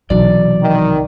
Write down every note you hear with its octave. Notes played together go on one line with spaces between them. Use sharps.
B1 C3 E3 F#3 D5
D#3